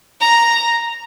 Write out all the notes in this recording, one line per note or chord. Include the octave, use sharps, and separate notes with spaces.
A#5